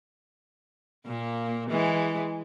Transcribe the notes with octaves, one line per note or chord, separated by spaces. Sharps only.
A#2 A#3
E3 G#3